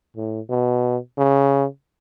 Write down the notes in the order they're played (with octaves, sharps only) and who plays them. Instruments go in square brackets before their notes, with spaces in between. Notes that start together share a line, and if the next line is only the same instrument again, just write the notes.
[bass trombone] A2
B2
C#3